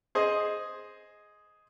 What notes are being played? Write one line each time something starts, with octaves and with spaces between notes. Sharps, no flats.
G#4 C5 D#5